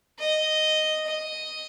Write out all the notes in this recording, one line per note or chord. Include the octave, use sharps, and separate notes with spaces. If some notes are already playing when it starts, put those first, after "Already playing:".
D#5
D#5